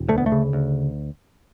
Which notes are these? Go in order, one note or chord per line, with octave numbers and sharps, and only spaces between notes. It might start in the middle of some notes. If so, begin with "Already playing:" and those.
Already playing: E1
D2 A3
B3
A3
C#3
D2